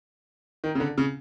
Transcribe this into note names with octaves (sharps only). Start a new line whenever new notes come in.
D#3
C#3
D3
C#3